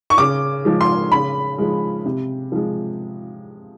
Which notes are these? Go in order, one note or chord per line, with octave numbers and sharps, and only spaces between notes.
C#6
C#3 D6
F3 G#3
C6
C#3 B5
F3 G#3
C3
F3 G#3